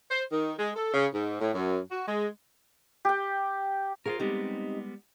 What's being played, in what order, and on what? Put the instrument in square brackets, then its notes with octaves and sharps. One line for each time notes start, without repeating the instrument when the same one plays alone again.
[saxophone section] C5
D#3
G#3
A4
C#3
G#2
A2
F#2
F#4
G#3
[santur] G4 G5
[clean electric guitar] F4 F#4 A#4 [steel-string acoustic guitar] G#4 C5 F5
[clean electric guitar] G3 G#3 B3 [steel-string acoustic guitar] C4 D#4 G4